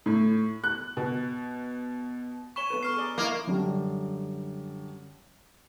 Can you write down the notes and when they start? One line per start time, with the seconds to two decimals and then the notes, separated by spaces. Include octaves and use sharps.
0.06 A2
0.64 F#6
0.97 B2
2.56 C#5 G#5 B5 C#6 E7 G7
2.70 B3 A4 B4
2.83 C#6 F6 C7
2.96 G#4 D5 A#5
3.18 A#3 E4 D#5
3.47 F#2 D3 G3